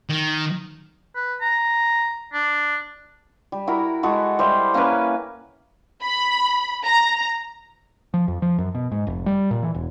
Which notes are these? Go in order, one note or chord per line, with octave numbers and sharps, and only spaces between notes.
D#3
B4
A#5
D4
G3
E4 F#4 A#4
G#3 F#4 A4
G3 C5 E5
A#3 C#4 A#4 B4
B5
A#5
F3
F2
F3
F#2
B2
G#2
F1
G3
A#2
E3
E1